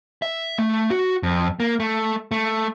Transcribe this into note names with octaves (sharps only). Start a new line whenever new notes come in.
E5
A3
F#4
F2
A#3
A3
A3